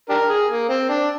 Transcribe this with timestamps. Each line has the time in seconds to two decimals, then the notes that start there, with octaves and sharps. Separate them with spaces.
0.10 D4 G4 A#4
0.29 G#4
0.50 A#3
0.69 C4
0.89 D4